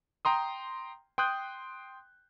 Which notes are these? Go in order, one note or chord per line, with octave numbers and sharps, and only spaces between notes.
G5 A#5 C6 D#6
G5 C6 D#6 F#6 G6